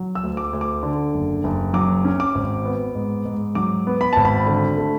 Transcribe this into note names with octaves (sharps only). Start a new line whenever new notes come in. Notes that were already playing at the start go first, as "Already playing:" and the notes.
Already playing: F#3
E6
D2
D6
D2
D6
D3
F#1
F#1
F#3 D6
C#4
D6
G#1
B3
G#2
G#2
F#3 D6
B3
B5
G#1 A5
B5
D3
A3